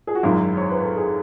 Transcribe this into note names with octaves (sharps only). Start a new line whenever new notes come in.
G#4
F#4
G#1 F#2 D#3 G#3 E4
C#5
B4
A4
G#4